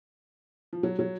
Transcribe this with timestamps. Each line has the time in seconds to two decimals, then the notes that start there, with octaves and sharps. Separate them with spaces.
0.73 F3
0.83 F#3
0.99 F#3